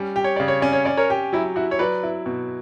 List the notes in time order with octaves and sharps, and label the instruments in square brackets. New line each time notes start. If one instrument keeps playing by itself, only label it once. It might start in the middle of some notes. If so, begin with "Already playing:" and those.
Already playing: [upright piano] G3 C#4
G4
[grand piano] C#5
[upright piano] C#3 [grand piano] D5
[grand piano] C#5
[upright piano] C#4 [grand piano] D5
[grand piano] C#5
[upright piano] C#4 [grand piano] D5
[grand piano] A#4 C#5
[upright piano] G4
[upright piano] F#3 [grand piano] E4
[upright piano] E4 [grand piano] F#4
[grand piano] C#5
[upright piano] F#3 [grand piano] B4 D5
[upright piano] E4
B2